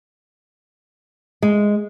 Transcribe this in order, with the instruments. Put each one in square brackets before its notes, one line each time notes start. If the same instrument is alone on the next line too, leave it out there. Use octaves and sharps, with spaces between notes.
[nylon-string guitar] G#3